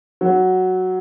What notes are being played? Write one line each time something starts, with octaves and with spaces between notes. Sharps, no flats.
F#3